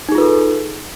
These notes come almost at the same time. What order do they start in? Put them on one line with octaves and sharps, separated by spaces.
D#4 G#4 F4 B4 A4